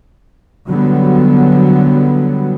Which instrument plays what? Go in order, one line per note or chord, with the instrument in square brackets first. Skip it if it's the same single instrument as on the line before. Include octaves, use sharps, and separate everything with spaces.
[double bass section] D3 F#3 G3 B3